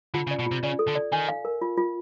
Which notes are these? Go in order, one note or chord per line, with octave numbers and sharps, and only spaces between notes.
D3 F4
C#3
D5
B2
C3 F4
C#3 D5
A4
D3
D5
D#3 G#5
F5
A#4
F4
F4